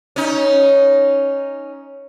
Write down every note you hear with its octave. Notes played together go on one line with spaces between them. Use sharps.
C#4 D#4